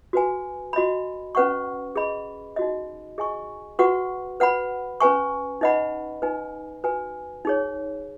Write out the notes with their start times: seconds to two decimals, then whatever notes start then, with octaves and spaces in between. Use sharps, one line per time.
0.13 F#4 B4 G#5
0.73 F#4 D#5 B5
1.35 C#4 B4 F#5 C#6
1.96 G#4 D#5 B5
2.56 D#4 F#4 D#5
3.18 G#4 D#5 G#5 C#6
3.79 F#4 B4 F#5 C#6
4.40 B4 F#5 B5
5.00 C#4 B4 G#5 C#6
5.61 D#4 B4 D#5 F#5 B5
6.22 D#4 B4 G#5
6.84 F#4 B4 G#5
7.45 D#4 G#4 C#5